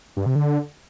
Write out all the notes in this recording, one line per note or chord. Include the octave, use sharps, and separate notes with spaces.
G2
C3
D3